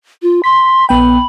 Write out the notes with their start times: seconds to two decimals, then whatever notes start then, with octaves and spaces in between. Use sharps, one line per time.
0.23 F4
0.44 C6 B6
0.89 A#1 B3 G5 B5